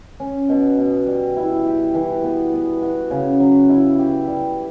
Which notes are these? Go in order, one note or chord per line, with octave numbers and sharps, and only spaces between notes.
C#4
B2
B2
G3
E4
G4
E3
B3
B3
F#4
C#3
F#3
E4
G4
G3